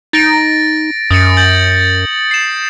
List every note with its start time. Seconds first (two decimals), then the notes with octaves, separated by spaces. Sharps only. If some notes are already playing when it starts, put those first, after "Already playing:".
0.13 D#4 A6 A#6 D7
1.11 F#2 D#6 A6 C#7
1.37 G6 A6 F#7
2.31 C7 E7